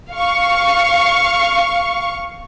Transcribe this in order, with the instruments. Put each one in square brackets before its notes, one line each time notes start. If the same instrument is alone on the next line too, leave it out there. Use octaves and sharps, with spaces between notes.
[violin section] F5 C#6